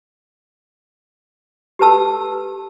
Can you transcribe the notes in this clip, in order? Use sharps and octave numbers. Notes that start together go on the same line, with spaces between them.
G4 A4 B4 A5 E6